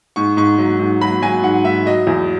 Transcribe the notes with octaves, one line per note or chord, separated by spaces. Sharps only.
G#2 C#6
G#2 C#6
F#3
G#2
F#3 B5
F#3 G#5
G#2 F#5
G#2 E5
F#3 D#5
E2